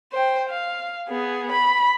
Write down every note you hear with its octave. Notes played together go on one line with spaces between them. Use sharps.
C5 G5
F5
B3 G#4
B5